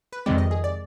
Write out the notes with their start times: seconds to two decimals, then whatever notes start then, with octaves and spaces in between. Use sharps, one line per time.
0.13 B4
0.26 F2 C3 D#3 G#3 C4 D5
0.38 D#5
0.51 G#4
0.64 D5